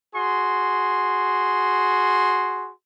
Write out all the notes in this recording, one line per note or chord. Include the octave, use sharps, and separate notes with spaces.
F#4 G#4 C6